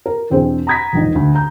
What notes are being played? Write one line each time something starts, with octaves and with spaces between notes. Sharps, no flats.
A#4
E2 B2 C4 D4 G#4 C5
A#5 B5 D#6 G#6 A#6 B6
E1 A#1 D#4
D2
A#5 G6